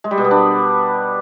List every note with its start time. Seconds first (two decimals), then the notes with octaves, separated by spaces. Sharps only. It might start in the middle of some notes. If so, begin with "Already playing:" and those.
0.04 G#3
0.11 G3
0.18 B2
0.24 B3
0.31 D4